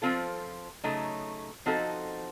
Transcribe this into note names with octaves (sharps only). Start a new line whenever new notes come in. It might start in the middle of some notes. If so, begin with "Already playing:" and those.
F3 C4 F4 A4
C#3 F#3 A3 D#4
F3 C4 D#4 F#4 A4